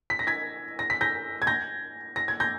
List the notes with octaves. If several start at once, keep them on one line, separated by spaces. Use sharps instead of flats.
B6
A#6
G#6 B6
A#6
B6
G6 A#6
G#6
G6 A#6
A#6
G#6
G6 A#6